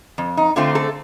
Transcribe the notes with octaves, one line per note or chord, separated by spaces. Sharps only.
F2
D#4
D3 A3 C4 F4
A4